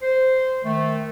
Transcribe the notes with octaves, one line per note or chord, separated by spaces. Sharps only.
C5
D#3 A3